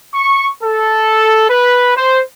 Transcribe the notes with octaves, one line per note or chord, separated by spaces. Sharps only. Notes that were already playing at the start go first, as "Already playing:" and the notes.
C#6
A4
B4
C5